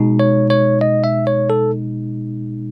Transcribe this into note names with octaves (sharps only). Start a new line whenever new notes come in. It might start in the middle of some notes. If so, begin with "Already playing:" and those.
Already playing: B2 G#3 D#4
C#5
C#5
D#5
E5
C#5
A4